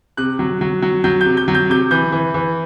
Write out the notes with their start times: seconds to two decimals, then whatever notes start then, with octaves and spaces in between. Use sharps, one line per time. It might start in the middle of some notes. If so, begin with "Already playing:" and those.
0.17 C3 F#6
0.39 F#3
0.61 F#3
0.82 F#3
1.04 F#3 G6
1.21 G6
1.26 C3
1.37 G6
1.48 F#3
1.55 G6
1.70 C3 G6
1.91 E3 G6
2.12 E3
2.34 E3